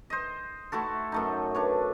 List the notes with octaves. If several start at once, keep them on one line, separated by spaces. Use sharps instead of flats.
C5 D#5
A3 E4 F#4 A4
F#2 A3 D#4
D4 B4 C#5